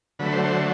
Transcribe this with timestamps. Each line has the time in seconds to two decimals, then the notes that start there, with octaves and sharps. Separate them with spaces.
0.19 D3 F#3 A3 B4
0.32 C5
0.45 C5